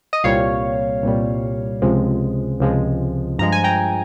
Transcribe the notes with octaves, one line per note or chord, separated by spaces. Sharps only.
D#5
C2 A#2 G3 C#5 F5
C2 A#2 G3
C#2 C3 F3 G#3
C#2 C3 F3 G#3
G2 F3 G#3 A#5
G#5
G5 A#5